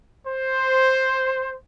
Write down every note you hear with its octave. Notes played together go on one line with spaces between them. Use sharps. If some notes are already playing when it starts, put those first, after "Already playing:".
C5